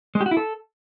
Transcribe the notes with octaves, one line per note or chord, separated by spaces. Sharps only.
G#3
G4
F#4
E4
A4